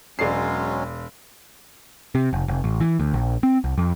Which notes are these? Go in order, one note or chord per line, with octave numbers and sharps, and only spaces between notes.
E1 F#3 G#3 C#4 D5 C7
C3
F1
F1
A1
E3
D2
A#1
C4
C2
F2